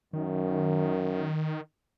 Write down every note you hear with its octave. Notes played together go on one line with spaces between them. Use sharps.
F#2 D#3